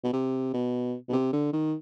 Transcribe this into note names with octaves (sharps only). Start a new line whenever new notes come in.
B2
C3
B2
B2
C3
D3
D#3